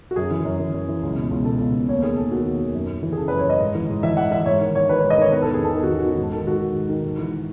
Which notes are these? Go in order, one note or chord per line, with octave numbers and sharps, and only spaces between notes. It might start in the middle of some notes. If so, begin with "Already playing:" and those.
F#4
F#2 G#4
E3
F#2
E3
F#2
E3
C#2
B2
C#2
B2 A4
C#2
B2
D#2 C#5
D#3 G#4
D#2 A4
D#3 F#4
D#2
D#3
F#2
F#2
E3
G#4
C#3 A4
B4
F#2
C#5
F#2 D#5
G#2
E3
G#2
E3 E5
G#2 F#5
E3 E5
G#2 C#5
D#3
G#2 C#5
D#3 B4
C#5
G#2
D#5
D#3 C#5
E2 B4
A4
D#3
G#4
E2 A4
D#3 G#4
F#4
E2
D#3 F#4
G#2
D#3 A4
G#2 F#4
D#3
G#2
D#3
G#2
E3